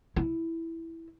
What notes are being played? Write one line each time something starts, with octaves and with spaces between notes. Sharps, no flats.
E4